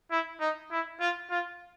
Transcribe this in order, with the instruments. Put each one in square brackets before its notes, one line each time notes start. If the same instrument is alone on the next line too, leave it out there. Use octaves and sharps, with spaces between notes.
[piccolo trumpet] E4
D#4
E4
F4
F4